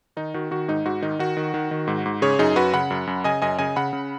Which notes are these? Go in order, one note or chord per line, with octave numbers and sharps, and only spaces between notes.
D#3 D#4
D#3 F#4
D#3 F#4
G#2 D#4
G#2 F#4
D#3 D#4
D#3 F#4
D#3
D#3
D#3
G#2
G#2
C#3 G#4 C#5
F#2 D#4 G#4
F#2 F#4 B4
C#3 F#5 B5
F#2
F#2
C#3 D#5 G#5
F#2 D#5 G#5
C#3 D#5 G#5
C#3 F#5 B5
C#3